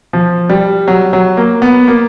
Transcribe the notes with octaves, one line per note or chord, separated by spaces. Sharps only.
F3
G3
F#3
F#3
A#3
B3
A#3